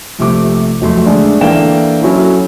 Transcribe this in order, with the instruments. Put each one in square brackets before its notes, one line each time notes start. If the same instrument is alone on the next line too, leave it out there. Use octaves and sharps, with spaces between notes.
[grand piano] A#1 C3 A3 D6
F1 F#3 A3 C6
D3 G#3 A3 D4
E3 A#3 D4 A4 G5 E7
F#3 C#4 E4 F#4 A4